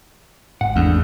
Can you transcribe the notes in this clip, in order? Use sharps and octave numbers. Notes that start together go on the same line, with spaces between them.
G#1 G#2 F#5
E2 A3 D4